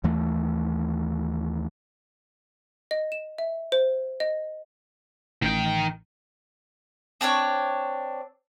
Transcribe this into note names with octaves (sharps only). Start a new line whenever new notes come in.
D#2 E3 A3
D#5
E7
E5
C5
D#5
A1 D#3 G5
C4 D4 A4 C#5